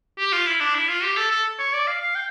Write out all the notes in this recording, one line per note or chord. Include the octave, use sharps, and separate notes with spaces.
G4
F4
E4
D4
E4
F4
G4
A4
A4
C#5
D5
F5
F5
G5